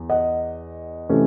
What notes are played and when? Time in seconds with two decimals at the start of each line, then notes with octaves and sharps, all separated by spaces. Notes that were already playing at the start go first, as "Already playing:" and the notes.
Already playing: E2
0.10 D#5 F#5
1.09 C3 E3 A3 C#4